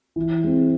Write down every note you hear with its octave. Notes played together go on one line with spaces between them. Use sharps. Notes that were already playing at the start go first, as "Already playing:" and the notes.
E3
G#3 C4